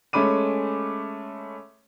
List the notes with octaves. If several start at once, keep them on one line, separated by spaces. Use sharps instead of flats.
G#3 A3 C#4 B5 D6 D#7